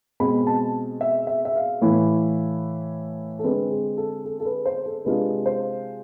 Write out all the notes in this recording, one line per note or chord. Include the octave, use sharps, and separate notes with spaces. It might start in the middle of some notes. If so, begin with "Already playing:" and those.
B2 G#3 C4 B5
A5
E5
E5
E5
F5
A2 E3 A3 E4
A4
D3 G#3 C4 B4
G#4
A4
A4
A4
B4
C5
A4
C3 G#3 D4 F4 B4
C5